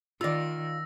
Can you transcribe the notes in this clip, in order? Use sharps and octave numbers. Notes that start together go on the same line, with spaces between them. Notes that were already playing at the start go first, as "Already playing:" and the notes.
D#3 F4 D5 E6 A#6